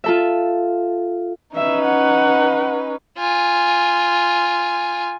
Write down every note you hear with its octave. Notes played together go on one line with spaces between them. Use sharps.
F4 A4 E5
C#4 D#4 B4 E5
F#5
F4 G#5